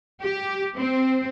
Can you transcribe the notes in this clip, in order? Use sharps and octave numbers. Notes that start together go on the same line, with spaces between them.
G4
C4